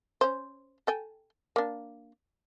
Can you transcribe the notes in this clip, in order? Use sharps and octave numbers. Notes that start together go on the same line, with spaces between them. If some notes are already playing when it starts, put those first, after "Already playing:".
C#4 C5
A4 G5 G#5
A#3 D4